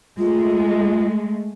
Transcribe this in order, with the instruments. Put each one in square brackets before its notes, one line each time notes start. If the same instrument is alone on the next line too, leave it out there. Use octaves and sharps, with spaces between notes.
[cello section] G#3 A3 [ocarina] F4